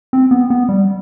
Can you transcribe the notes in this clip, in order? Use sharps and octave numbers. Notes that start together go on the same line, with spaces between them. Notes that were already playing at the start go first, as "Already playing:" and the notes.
C4
B3
B3
G3